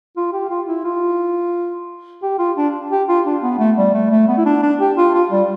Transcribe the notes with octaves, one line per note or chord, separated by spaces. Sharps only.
F4
G4
F4
E4
F4
G4
F4
D4
G4
F4
D4
B3
A3
G3
A3
A3
B3
E4
D4
D4
G4
F4
F4
G3